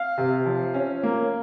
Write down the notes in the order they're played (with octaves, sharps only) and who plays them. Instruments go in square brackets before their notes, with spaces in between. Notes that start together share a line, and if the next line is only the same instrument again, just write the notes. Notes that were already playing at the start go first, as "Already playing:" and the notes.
Already playing: [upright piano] F5
C3
F3
C#4
A#3